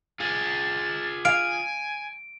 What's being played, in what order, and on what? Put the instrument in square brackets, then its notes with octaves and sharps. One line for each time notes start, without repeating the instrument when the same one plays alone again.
[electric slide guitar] F4 G#4 [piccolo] A6
[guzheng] F5 [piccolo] G#5 [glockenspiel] D7